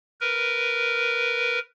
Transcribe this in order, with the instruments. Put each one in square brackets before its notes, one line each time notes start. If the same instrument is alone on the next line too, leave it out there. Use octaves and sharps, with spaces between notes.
[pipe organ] A#4 B4